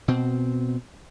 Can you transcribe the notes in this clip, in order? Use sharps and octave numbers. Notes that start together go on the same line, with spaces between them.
B2 C4